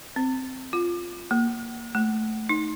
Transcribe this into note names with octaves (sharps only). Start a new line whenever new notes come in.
C4
F4
A#3
A3
D#4